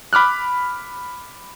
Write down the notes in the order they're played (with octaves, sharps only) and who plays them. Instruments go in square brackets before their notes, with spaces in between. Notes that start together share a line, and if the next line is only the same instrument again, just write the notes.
[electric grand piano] B5 D6 F6 F#6